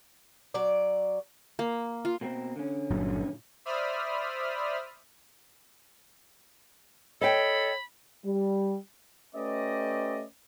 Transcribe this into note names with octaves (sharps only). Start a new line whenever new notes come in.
F#3 D5
A#3
F4
B2 A#3 C4
D3 C#4
G1 A#2 F#3
C5 D5 E5 B5 D#6 F6
A4 C#5 D#5 G5 B5
G3
A3 C#4 G4 B4 D5 D#5